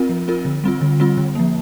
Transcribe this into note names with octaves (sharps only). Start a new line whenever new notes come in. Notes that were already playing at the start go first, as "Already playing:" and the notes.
Already playing: C4 F4 A#4
F3
C4 F4 A#4
D3
G3 C4 F4
D3
G3 C4 F4
D3
F3 A#3